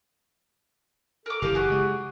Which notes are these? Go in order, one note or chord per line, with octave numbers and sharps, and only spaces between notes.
A4 A#4 D6
F#1 E3 G4 A4 A#4 F5
F#4 G#4 D6
C#3 G#3